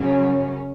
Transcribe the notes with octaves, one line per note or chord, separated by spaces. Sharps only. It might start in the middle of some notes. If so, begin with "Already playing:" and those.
Already playing: F#2 C#3 F#3 C#4